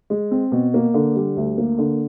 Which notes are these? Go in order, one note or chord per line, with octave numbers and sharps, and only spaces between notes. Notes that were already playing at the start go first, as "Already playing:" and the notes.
G#3
C4
B2
A#3
D3
G3
D2
A#3
D3